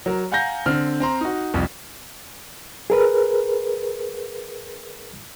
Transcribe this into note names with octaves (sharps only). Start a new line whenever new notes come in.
F#3 A#4
F5 F#5 G#5 A#5 G6 A#6
D3 C4 F6
C4 A#5 C6
D#4 F#4
C2 F2
G#4 A#4 B4